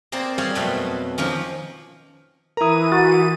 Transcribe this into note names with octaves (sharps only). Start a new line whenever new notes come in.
A#3 C4 G#4 C5 D5
G3 G#4 C#5 F5
F2 B2 F#3 A3 F4
D#3 F3 A#3 C#4
E3 E4 A#4 A#5 D#6 D#7
F#4 A6